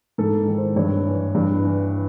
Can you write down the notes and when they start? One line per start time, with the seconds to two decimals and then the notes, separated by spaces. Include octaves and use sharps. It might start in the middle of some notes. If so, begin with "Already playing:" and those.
0.18 G#2 A4
0.47 D#3
0.58 C5
0.76 G2 C#5
1.05 E3
1.35 G2
1.63 E3